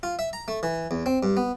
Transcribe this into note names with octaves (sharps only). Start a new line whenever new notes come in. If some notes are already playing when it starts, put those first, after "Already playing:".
F4
E5
A#5
A3
E3
E2
C4
G2
B3